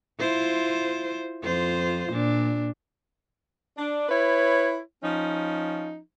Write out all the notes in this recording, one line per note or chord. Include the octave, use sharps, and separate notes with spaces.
E4 F4 C5
F2 F4 C5
A#2 D4
D4
E4 B4 C#5
F3 C#4 D#4